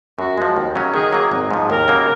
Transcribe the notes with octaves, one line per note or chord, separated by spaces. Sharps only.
F#2 F#4
F3 G#3
D#2
C#3 F#3 C#4
D#3 G#4
F#3 A#3
G#1
G#2 F3
D#2 A#4
C#3 F#3 A#3